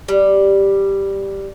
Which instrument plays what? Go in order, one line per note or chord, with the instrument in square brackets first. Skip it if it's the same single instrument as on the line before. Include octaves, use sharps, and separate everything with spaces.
[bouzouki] G3